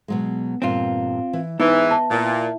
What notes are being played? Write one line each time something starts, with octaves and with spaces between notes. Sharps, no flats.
B2 F#3 G#3
E2 G2 A#2 C4 F4
E3
G#2 E3 B3 D#4 E5
D#5 A5
A#2 E4